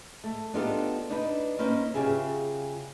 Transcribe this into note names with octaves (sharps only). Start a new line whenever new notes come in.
A3
B3 D4 D#4 F4 G4 A4
D4 D#4 B4
A#3 C#4 D#4 B4 C5
C#3 F4 G4 G#4 E5